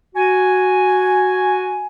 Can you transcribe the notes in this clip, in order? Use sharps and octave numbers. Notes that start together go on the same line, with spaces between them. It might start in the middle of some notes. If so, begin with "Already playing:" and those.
F#4 G#5